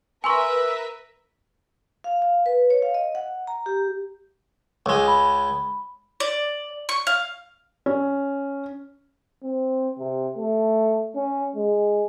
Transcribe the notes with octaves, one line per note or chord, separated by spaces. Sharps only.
A#4 B4 E5 G#5 C6 C#6 E6
F5
F5
B4
C#5
F5
D#5
F#5
A#5
G4
C#2 G#3
B5
D5
C#6
F5
C#4
C4
C3
A3
C#4
G#3